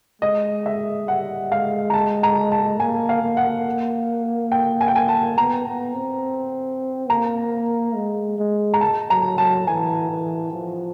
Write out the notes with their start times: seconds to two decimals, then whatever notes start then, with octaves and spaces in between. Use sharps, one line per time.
0.22 G#3 D#5
0.66 E5
1.08 G3 F#5
1.52 G#3 F5
1.90 A#5
1.93 A5
2.23 A#5
2.52 A5
2.80 A#3 G#5
3.09 F5
3.23 A#3
3.37 F#5
4.52 G5
4.81 G#5
4.88 G5
4.96 G#5
5.08 A5
5.38 B3 A#5
5.67 B3
5.95 C4
7.09 A#3 A#5
7.95 G#3
8.38 G#3
8.74 A#5
8.81 A5
9.10 F#3 A#5
9.38 F#3 A5
9.67 E3 G#5
10.10 E3
10.53 F3